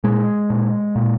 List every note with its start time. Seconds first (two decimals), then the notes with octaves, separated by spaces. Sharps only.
0.04 A#2 G#3
0.50 A#2
0.95 A#2